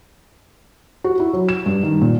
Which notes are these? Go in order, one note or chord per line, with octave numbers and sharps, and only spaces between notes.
F#4
E4
F#3
E7
G2
D#3
A#2